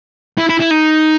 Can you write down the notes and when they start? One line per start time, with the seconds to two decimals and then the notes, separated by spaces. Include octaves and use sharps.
0.38 E4
0.49 E4
0.60 E4
0.71 D#4